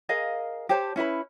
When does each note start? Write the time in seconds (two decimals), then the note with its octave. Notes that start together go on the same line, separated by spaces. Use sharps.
0.09 G#4 A#4 D#5 F5
0.69 G4 C5 C#5 A5
0.96 C#4 E4 B4 B5